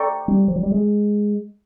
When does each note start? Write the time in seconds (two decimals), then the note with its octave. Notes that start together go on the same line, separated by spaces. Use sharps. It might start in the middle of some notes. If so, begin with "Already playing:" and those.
Already playing: A4 D5 G5 A#5 C#6
0.28 G3
0.48 F3
0.56 F#3
0.63 G3
0.72 G#3